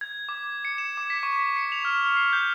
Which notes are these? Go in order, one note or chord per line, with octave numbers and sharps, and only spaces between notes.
G#6
D6
C#7
E7
D6
B6
C#6
C#7
F7
F6
C7
G6